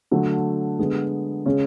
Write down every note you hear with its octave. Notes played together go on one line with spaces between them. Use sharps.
D3 F#3 A3
D3 G#3 B3
C#3 G#3 C#4